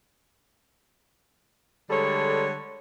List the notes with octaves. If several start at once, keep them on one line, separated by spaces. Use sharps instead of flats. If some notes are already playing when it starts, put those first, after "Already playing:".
D3 G3 G#3 A4 C#5